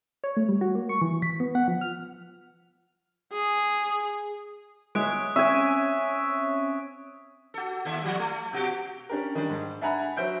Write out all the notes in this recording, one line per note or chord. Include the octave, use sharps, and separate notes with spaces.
C#5
A3
G3
F#4
A#3
C#6
E3
B6
B3
F#5
F3
F6
G#4
G#3 C#5 E5 D#6 F#6 D7
C4 C#4 E5 G#5 C#6 B6
F#4 A4
D#2 A4 E5
F3 G3
A3
B2 F#4 G4
C#4 D4 G4 A#4
D#3 G3 D4 G4
G#2
D4 E5 F#5 G#5 A#5 B5
F#3 C5 E5 G6 D7